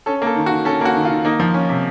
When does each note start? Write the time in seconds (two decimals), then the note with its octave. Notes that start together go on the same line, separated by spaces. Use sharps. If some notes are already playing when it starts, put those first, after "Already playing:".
0.06 C#4 A4
0.22 A#3 A4
0.36 D#3
0.46 F#4
0.51 D#3
0.65 C#4 A4
0.81 A#3 F#4
0.95 D#3
1.05 F4
1.10 D#3
1.25 A#3 D#4
1.40 F3
1.54 C#4
1.69 C3